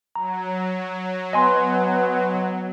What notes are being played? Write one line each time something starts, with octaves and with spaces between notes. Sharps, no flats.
F#3 A#5
B3 D#5 G#5 C6